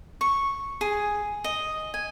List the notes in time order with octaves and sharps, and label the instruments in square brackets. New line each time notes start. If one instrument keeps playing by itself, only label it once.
[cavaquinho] C#6
G#4
D#5
G#5